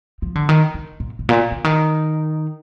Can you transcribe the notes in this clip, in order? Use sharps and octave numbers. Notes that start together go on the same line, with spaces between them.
F3
D3
D#3
D3
A#2
G#2
A#2
D3
D#3